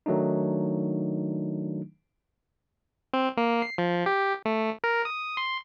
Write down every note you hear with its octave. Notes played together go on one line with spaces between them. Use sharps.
D#3 F#3 A3 D4 D#4
C4
A#3
C7
F3
G4
A3
A#4
D#6
C6